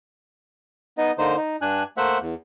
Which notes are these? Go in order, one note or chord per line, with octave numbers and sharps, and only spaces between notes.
B3 D#4 D#5
D3 A#3 D#4 C5
D#4
G2 D4 G#5 F#6
A3 A#3 C5 E5 F#5
E2